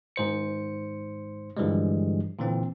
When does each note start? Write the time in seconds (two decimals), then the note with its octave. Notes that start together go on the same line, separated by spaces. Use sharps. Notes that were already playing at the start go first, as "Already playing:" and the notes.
0.16 G#1 G#2 C5 C#7
1.57 G2 D3 E3 F3 G3 G#3
2.39 A#2 D3 E3 C4